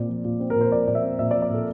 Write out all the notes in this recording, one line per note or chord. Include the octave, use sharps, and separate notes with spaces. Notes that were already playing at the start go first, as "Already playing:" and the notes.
Already playing: A#2 C4 D5
F3
A#2
C4
A#4
A#2 C5
F3 D5
A#2 D5
E5
C4
A#2 E5
D5
F3
D5
A#2 A4